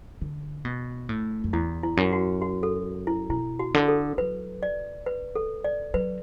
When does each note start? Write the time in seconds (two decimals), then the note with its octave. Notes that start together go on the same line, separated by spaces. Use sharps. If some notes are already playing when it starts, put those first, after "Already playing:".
0.22 D3
0.65 B2
1.09 A2
1.44 F#2
1.53 E2 E4
1.83 E4
1.97 F#2
2.13 F#4
2.42 F#4
2.63 A4
3.07 E4
3.29 B2 E4
3.59 F#4
3.74 D3
3.88 A4
4.18 F#3 B4
4.63 D5
5.06 B4
5.36 A4
5.64 D5
5.94 F#3 B4